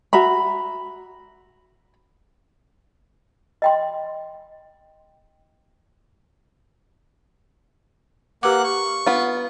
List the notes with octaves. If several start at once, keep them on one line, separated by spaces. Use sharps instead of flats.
F#4 E5 A#5 B5
D#5 G5 C6
A#3 G4 B4 F#5 D6 F#6
C#6
B3 F4